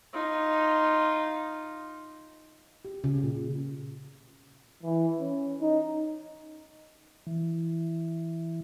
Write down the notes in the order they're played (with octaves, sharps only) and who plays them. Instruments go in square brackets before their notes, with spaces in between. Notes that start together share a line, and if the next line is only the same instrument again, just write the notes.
[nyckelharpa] D#4 F4
[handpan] G4
C#3
A#2
[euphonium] E3
C#4
D#4
[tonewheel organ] E3